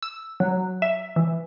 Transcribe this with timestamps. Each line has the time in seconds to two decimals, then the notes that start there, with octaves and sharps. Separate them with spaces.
0.03 E6
0.40 F#3
0.82 E5
1.16 E3